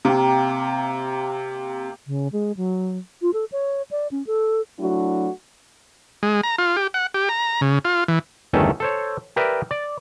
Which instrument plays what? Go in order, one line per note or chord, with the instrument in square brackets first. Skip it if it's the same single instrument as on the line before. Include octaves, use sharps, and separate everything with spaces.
[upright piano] C3 [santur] A#3 G4
[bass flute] C#3
G#3
F#3
F4
A4
C#5
D5
C#4
A4
[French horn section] F#3 A3 D4 E4 F#4
[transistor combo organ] G#3
A#5
F4
G4
F#5
G4
A#5
C#3
F4
E3
[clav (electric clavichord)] G1 E2 D#3 A3 C#4 A4
A4 C5 C#5
G4 A#4 B4 D5 E5
D5